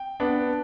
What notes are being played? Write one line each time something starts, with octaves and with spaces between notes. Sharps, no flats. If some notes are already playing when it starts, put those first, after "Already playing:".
Already playing: G5
B3 D4